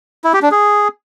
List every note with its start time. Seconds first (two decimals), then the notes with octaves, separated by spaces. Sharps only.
0.24 E4
0.33 G4
0.42 D4
0.51 G#4